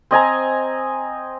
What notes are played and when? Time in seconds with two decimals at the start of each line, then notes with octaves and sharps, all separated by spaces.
0.11 C4 D#5 G#5 A#5